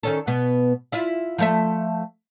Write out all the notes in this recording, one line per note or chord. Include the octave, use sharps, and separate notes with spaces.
D#3 C#4 A4
B2 B3
E4 F4 E5
F3 A3 E5